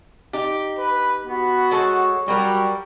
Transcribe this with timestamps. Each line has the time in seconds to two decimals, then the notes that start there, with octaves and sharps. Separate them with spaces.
0.33 D#4 G4
0.78 B4
1.27 B3 F#4
1.71 G#3 A4 C#5
2.28 F#3 G3 F#4 A#4